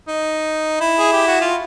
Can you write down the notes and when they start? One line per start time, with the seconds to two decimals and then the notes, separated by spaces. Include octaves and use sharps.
0.08 D#4
0.81 E4
0.99 G#4
1.13 G4
1.27 F#4
1.41 F4